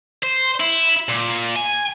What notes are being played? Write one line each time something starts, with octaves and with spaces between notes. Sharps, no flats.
C5
E4
A#2
G#5